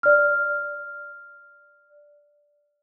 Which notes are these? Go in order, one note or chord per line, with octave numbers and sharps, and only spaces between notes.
D5 F6